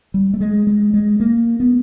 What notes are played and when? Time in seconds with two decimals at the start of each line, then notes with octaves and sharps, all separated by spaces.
0.14 G3
0.34 A3
0.40 G#3
0.67 G#3
0.94 G#3
1.20 A#3
1.60 B3